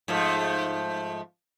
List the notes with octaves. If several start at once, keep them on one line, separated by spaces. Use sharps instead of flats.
G#2 F3 A3